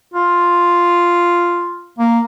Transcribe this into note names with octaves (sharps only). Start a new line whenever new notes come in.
F4
A#3